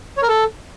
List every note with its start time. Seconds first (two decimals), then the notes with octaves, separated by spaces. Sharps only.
0.17 C#5
0.23 A#4
0.28 A4